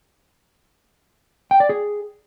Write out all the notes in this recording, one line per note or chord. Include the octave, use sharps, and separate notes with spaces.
G5
D5
G#4